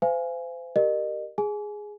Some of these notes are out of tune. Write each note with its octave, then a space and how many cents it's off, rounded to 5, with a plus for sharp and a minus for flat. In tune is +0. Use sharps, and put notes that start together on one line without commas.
C5 -35 F5 -35 G#5 +0
G4 +0 A#4 +0 D#5 -35
G#4 +0 G#5 +25